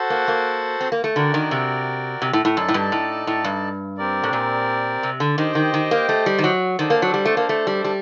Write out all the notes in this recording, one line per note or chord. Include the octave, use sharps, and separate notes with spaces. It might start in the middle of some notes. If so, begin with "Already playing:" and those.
Already playing: F#4 A4 C5 F#5
A#3
A#3
C4
A#3
A3
D3 F#4 A#4 D5 G5
D#3
C3
C3
A2
A2
F#2 D#4 A4 D5 A5
A2
G2
A2
A2
G2
C4 G4 A#4 D5
A2
A#2
C3
D3
D#3 G4 C5 D#5 G5
D#3
D#3
A#3
A3
G3
D#3
F#3
D#3 D4 A4 C5
A#3
F#3
G3
A3
A#3
A3
G3
G3